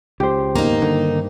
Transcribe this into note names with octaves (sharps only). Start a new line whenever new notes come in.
C#2 G4 C5
D#2 G#2 A#3 B3 D#4
G2 D3 D#3